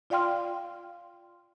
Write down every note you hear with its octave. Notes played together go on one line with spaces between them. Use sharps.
F4 D5 F5 G5 C6 F6